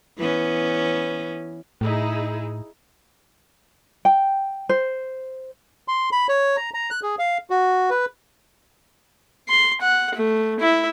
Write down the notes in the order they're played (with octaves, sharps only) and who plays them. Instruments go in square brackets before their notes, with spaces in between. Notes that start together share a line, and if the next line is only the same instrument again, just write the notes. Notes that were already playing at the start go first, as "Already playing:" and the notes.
[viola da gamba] E3 B3 C#4
[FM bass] A2 [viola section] D#4 E4 G#4
[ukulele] G5
C5
[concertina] C6
B5
C#5
A#5
A#5
F#6
G#4
F5
F#4
B4
[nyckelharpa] C6
F#5
A3
E4 E5